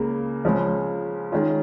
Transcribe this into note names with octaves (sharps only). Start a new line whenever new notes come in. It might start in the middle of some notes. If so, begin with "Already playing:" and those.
Already playing: C#2 C#3 A#3
C#2 C#3 F3 G#3 C#4
D#3 G#3 C#4 F4